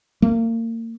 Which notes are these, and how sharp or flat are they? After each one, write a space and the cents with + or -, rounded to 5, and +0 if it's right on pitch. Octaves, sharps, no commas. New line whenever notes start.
A#3 -35